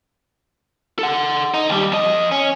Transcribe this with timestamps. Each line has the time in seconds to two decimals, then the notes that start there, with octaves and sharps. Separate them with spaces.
0.99 A4 F#5
1.54 D#4
1.69 D#2 G3
1.92 F2 D#5
2.31 C#4